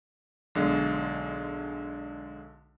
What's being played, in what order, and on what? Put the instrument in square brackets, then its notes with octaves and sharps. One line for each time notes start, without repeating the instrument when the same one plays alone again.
[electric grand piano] B1 D3 G#3